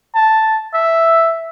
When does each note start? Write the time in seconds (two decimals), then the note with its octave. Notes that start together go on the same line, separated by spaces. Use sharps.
0.15 A5
0.74 E5